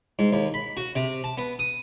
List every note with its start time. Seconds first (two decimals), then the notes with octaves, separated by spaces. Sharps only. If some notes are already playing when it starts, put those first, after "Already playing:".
0.19 G#2
0.33 D#2
0.54 B5
0.77 F#4
0.95 C3
1.24 A5
1.38 B3
1.59 D#6